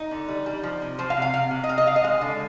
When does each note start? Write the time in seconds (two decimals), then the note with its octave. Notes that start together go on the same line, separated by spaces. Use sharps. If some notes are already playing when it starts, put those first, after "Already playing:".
Already playing: D#4
0.11 D3
0.28 G3
0.46 G3
0.63 F3
0.82 C3
0.98 F3 C5
1.10 F5
1.17 C3
1.22 F5
1.33 C3 F5
1.51 C3
1.64 D#5
1.69 C3 F5
1.78 D#5
1.87 C3 F5
1.96 D#5
2.04 G#3 F5
2.21 D3